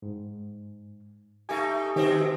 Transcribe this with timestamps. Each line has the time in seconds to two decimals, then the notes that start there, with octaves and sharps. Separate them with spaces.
0.02 G#2
1.49 A3 D#4 G4 G#5
1.96 B2 D#3 C4 G4